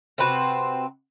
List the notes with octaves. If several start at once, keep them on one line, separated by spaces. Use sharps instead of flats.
C3 C4 F#4 B4